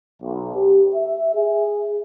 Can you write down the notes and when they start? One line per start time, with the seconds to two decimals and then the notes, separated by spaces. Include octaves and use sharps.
0.22 B1
0.55 G4
0.94 E5
1.34 G#4